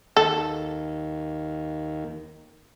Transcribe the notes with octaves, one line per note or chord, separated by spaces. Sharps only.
D#2 A4